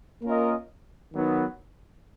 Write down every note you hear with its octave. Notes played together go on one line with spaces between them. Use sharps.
A#3 C#4 F4 A#4 D#5
D#3 F#3 B3 D#4